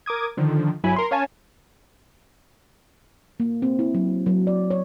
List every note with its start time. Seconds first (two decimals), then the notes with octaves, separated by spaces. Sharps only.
0.06 A#4 D6 D#6 G#6
0.37 D3 D#3 F3
0.83 G1 F#3 E4 G#5 B5
0.96 A#4 C6
1.11 C#4 C#5 F5 G#5 A5
3.40 A#3
3.62 C4
3.79 E4
3.94 F#3
4.26 F#3
4.47 D5
4.70 C#5